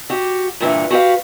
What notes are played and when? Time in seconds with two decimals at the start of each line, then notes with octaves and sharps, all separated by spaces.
0.10 F#4 G4
0.60 G2 A#2 D3 E3
0.90 F#4 G4 B4 F5